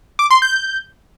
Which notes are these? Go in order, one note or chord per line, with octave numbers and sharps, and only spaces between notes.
D6
C6
G6